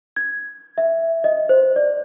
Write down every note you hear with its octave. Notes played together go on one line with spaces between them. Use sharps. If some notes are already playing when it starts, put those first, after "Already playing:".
G#6
E5
D#5
C5
D5